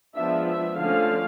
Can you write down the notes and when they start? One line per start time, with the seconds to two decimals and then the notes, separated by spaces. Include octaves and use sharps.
0.15 F3 G#3 B3 D4 E5
0.46 E5
0.77 D3 F3 A3 C#4 F5